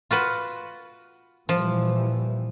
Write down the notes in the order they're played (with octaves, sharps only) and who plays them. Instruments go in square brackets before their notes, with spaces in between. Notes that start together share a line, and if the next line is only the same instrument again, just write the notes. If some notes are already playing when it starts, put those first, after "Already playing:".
[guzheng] F4 F#4 B4
[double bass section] A#2 E3 G3 [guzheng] F3